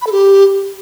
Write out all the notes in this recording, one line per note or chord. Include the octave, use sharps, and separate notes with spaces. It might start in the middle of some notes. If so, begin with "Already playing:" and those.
B5
A4
G4